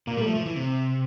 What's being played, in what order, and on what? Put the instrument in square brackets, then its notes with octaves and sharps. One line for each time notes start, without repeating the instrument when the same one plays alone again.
[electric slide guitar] A#2 [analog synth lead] A#3
[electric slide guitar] G3
[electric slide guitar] F3 [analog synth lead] A3
[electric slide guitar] F3
E3
C3